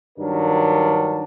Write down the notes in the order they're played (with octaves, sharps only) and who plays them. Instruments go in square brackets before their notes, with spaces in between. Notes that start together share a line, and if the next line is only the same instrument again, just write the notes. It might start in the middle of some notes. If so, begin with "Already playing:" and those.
[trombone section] G2 D#3 F#3 D4 A#4